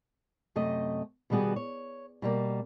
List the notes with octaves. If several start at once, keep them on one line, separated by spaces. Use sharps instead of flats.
F#2 C3 A3 D#5
B2 D#3 G3 B3 F#4 G#4
C#5
B2 G3 A#3